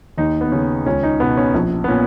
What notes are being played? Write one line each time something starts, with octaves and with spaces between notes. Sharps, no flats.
D#2 D#4
B3
C#3 C#4
C#2 C#4
D#4
B2 B3
C#4
A#1
B3
A#2 C#4